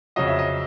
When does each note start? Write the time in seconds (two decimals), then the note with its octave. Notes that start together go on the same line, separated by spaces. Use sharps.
0.16 F2 C#3 F#3 D#5
0.27 E5
0.39 D#5